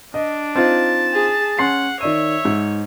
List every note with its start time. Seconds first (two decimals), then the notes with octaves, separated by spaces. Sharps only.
0.14 D4 D#5
0.55 C4 D#4 F4 A5
1.12 G#4
1.59 C#4 F#5 C6 C7
2.01 D#3 C#5 D5 E5 D#7
2.45 G#2